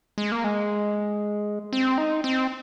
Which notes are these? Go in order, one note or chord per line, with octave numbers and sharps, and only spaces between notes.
G#3
A#3
G#3
C4
D#4
C4